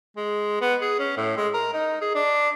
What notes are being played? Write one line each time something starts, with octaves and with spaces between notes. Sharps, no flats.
G#3
B3
G#4
C#4
A2
G#3
A#4
D#4
G#4
D4